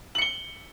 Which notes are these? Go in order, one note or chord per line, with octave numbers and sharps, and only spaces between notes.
C#7 F#7 G7